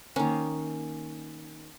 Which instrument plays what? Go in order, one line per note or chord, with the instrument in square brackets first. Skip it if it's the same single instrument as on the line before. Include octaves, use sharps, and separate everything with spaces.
[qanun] D#3 A#3 C#4